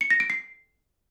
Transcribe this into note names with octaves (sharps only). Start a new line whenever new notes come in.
C#7
A#6
D7
C7